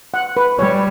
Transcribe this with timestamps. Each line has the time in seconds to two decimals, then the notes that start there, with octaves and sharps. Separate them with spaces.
0.14 F#5
0.37 B4
0.59 G3 C#5